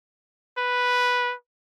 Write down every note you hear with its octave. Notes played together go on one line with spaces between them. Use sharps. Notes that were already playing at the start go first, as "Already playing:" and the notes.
B4